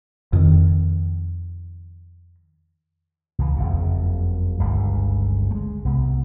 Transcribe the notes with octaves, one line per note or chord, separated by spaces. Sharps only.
F2 D#3
C#2 E3
F#1 F2 C#3
G1 C#2 C#3
G#3 A3
C2 B3